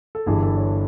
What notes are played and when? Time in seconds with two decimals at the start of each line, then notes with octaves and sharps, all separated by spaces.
0.15 A4
0.26 G1 G2 E3 G#4
0.42 A4
0.57 C#5